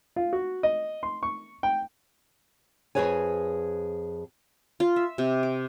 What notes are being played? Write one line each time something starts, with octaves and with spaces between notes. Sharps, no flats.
F4
F#4
D#5
C6
C#6
G5
F2 G3 G#4 B4 C#5 G#5
F4
E5
C3
D6